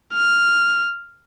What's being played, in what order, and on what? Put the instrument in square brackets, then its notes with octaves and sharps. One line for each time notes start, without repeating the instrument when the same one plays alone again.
[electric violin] F6